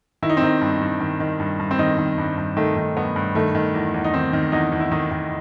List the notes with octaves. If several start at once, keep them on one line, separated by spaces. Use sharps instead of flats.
D#3 E4
D#4
C4
D#3 D#4
G2
G2
D#3
D#3
G2
G2
C4
D#3 D#4
D#3
G2
G2
D#3 A3
D#3
G2 B3
G2
D#3 A3
D#3
E2
E2
D#4
D#3 C4
D#3
E2 D#4
E2
E4
D#3 D#4
D#3